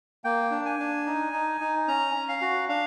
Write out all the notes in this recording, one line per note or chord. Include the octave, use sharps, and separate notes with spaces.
A#3 G5
D4
G#5
D4
D#4
D#4
D#4
C#4 A#5
C#4
F5
F#4
D4 F5